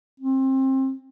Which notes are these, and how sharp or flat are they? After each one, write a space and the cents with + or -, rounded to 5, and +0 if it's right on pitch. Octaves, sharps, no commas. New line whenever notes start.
C4 +25